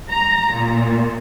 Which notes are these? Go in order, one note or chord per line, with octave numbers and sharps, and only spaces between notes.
A#5
A#2